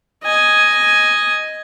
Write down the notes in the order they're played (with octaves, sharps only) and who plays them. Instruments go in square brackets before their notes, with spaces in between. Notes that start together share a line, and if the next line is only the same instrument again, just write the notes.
[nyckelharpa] D#5 G#5